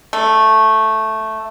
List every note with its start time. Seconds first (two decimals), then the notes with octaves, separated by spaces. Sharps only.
0.13 A3